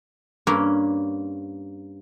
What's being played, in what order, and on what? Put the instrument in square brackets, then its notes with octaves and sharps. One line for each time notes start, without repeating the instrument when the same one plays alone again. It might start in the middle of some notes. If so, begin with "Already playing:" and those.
[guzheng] G2 A#3 C#4